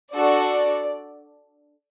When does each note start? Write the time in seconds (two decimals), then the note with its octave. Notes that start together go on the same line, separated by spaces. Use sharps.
0.13 D4 F#4 A4 D5